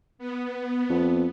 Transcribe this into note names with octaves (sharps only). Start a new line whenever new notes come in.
B3
F2